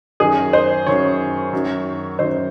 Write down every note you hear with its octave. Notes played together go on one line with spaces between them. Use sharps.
F#2 D#3 G#4
C5
F#2 D#3 C#5
F#2 D#3
F#2 D#3 C5